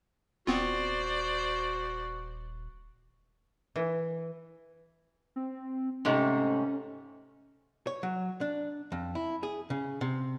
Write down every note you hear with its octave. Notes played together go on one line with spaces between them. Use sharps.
D#1 B3 C4 F4 F#4 C5 D5
E3
C4
G#2 C3 A3 C#4
C#5
F#3
D4
F2
E4
G#4
C#3
C3